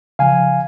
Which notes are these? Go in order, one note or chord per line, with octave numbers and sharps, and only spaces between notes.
C#3 F3 F5 G#5